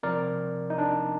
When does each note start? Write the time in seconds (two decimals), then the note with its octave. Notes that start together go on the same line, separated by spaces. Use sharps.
0.03 C3 F3 C4 A#4 D5
0.70 D#4
0.78 D4